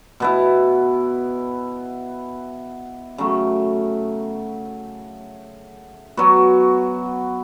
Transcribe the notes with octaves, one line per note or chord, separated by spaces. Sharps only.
B2 B3 E4
C#3 F#3 A3
F#3 B3 F#4